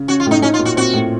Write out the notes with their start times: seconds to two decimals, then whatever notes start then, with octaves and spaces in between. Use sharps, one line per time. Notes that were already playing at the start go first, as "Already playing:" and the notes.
Already playing: C#3
0.08 C#4 F#4
0.20 F4
0.26 A2 D#4
0.42 C#4 D#4
0.54 F4
0.59 A#2
0.65 F#4
0.76 C4 F#4
0.93 A2